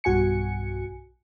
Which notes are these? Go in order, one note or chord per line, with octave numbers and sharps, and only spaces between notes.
B1 G2 F#4 G#5 C#7